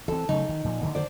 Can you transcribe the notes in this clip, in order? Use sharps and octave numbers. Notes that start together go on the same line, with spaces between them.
E3 C4 A4
C#3 F#3 A3 D#4
D#3
A#2 F3
D3 D#3 A#3
C5 D5